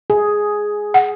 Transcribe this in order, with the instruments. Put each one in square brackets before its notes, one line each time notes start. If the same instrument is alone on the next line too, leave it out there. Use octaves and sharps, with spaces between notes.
[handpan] G#4
[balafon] F#5